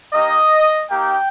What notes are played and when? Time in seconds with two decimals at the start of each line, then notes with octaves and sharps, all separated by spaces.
0.12 A#3 D#4 G4 D#5
0.89 A#3 D#4 G4 G5